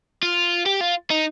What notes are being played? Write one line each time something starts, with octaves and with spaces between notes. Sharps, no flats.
F4
G4
F4
D#4